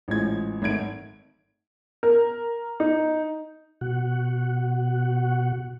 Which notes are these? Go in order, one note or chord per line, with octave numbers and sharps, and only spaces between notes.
A1 F3 G#3 G#6
G#1 A3 G#6 D7
A#4
D#4
B2 F#4 F#5